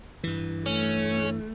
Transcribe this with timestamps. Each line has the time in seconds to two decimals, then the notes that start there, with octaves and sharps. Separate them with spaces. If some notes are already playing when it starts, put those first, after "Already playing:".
0.24 G2 E3
0.66 A3 C#4